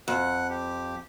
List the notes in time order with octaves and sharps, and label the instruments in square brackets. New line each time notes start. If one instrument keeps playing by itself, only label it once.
[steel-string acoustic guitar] F2 [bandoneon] F#5 F#6
[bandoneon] G4